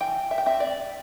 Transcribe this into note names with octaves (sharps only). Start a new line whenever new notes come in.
E3 G5
E5
G5
C4 E5
D5